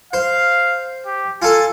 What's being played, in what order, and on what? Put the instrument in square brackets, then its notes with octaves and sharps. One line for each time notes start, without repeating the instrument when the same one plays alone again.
[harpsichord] C5 [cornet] F5
[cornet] G4
[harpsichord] F4 A4 [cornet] G#5